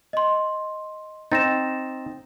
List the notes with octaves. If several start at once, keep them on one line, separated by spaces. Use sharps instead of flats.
D#5 C6
C4 D#4 A6 A#6 E7